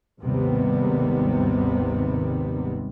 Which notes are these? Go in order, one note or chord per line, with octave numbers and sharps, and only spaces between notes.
G#1 D#2 C3 D#3 G3 B3